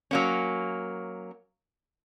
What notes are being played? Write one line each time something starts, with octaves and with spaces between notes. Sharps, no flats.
F#3 A#3 C#4